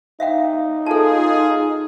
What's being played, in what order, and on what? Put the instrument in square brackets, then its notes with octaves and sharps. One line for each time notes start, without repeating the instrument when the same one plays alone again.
[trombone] D#4 [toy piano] E5 F5 G5
[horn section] F4 G#4 [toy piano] A4 A5